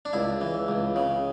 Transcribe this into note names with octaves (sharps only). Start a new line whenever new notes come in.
D4
C#2 E4
E3
C#2
C#3